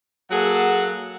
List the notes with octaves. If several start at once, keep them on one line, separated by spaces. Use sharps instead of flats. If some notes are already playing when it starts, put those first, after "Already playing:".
F#3 A#3 G#4 A4 F#5